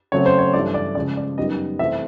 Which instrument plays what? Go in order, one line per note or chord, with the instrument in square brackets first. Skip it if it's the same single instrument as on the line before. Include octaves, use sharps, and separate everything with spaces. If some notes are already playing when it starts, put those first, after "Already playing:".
[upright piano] C#3 F#3 A3 C4 C#5
C5
C#5
G2 E3 A3 D5
D5
C#3 F3 G#3 D5
D5
F#2 D#3 G3 B3 D#5
C3 E3 A3 C4 E5